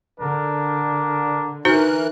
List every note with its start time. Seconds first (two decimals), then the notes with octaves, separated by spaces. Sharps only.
0.20 D3 D4 A#4
1.65 E3 D#4 F#4 A#4 C5 F#6